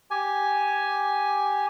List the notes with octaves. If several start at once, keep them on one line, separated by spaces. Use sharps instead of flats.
G4 G#5